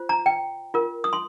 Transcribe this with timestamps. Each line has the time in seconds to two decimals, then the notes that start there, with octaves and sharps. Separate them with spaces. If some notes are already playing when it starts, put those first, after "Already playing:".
Already playing: F4 C5
0.09 A#5
0.26 G5
0.74 F4 A#4
1.04 D#6
1.13 C6